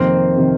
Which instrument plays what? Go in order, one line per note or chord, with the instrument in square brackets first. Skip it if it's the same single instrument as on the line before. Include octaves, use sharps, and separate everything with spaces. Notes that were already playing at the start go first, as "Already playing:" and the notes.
Already playing: [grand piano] F2 C3 D#3 [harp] A#3 C4
[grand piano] C3 D#3